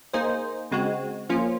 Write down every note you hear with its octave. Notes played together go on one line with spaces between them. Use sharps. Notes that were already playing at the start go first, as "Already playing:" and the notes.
A#3 D#4 G#4 C5
C#3 G#3 C4 F#4
F3 A#3 C#4 F4